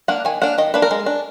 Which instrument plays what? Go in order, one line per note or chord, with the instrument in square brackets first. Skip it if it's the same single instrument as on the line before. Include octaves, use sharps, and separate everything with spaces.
[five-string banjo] A#3 D4 F#5
D#3 G#5
A#3 D4 F#5
D#3 D#5
A#3 D4 B4
A#4
G#3
D4